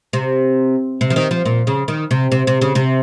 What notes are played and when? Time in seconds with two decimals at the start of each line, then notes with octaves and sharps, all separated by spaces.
0.13 C3
1.01 C3
1.10 F3
1.16 D#3
1.31 F3
1.45 A#2
1.67 C#3
1.88 D#3
2.11 C3
2.32 C3
2.47 C3
2.61 C#3
2.75 C3